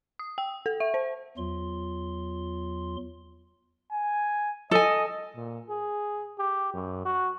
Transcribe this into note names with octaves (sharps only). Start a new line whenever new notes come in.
D#6
G5
A4
E5
C5
E2 F#3 F4 C6
G#5
A4 D#5 G#5
A#2
G#4
G4
F#2
F#4